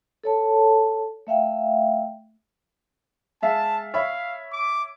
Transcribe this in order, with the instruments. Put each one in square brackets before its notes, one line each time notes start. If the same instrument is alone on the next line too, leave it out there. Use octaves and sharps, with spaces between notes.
[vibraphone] A4 C#5 A5
A3 E5 F5 G5
[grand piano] G#3 E5 F5 [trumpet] A5
[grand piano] C#5 E5 B5 [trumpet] F5
[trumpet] D6